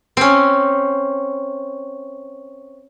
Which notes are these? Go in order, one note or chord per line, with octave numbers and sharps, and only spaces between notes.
C4 C#4